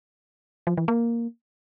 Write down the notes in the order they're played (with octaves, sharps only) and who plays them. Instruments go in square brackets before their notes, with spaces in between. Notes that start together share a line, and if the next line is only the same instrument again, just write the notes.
[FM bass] F3
E3
A#3